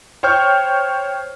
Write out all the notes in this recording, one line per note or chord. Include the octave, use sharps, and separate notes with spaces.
C5 C#5 G5 C#6 F6 G6